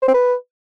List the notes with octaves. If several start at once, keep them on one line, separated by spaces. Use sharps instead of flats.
C5
C4
B4